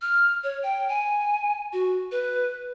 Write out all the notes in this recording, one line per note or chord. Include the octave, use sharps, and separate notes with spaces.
F6
C#5
G5
G#5
F#4
B4